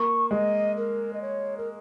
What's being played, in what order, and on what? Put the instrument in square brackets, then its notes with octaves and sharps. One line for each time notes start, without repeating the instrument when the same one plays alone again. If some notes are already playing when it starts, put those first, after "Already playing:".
Already playing: [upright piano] A#3 [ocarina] C#6
[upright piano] G#3 [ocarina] D#5
[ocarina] A#4
D#5
C#5
A#4